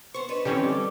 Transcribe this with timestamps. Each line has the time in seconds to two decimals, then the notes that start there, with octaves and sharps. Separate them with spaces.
0.14 B3 C5 C#6
0.29 D4 D#4 B4
0.45 D3 E3 C4 C#4 G4 C#5
0.62 G3 A4 D6